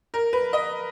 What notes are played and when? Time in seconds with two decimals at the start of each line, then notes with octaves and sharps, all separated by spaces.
0.14 A#4
0.33 B4
0.53 D#5